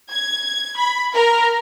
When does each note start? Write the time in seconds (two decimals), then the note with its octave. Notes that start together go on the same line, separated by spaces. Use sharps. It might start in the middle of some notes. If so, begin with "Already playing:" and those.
0.10 G#6
0.78 B5
1.14 A#4